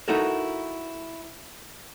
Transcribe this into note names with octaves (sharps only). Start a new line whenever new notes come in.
D#4 E4 F#4 A4 A#4